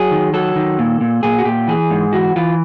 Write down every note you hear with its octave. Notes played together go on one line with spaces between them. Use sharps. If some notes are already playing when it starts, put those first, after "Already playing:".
Already playing: F#3 G#4
D#3
F#3 A4
D#3
A#2
A#2
A#2 G#4
F#4
A#2 G4
E3 G#4
G#2
E3 F#4
E3 F4